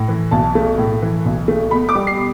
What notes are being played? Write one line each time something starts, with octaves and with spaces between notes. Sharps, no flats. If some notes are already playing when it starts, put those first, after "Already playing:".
Already playing: A2
E3
B1 A5
A3
A2
E3
B1
A3
B2 B5
D6
G3
C7